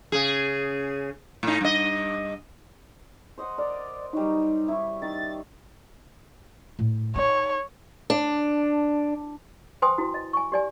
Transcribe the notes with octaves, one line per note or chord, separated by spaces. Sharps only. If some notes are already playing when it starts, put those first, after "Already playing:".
C#3 G#4
A2 D#4
G2 D#5
C5 D#5 F#5
A#4 D5
F#3 G3 D#4
E4 C#6
D#3 A6
A2
D#4 C#5
D4
B4 C5 G5 G#5 C6 D#6
E4 F#4
D#5
G#5 C#6
G4 D5 G#5